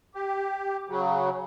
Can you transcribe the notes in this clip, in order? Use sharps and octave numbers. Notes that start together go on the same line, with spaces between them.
G4
C#3 F#3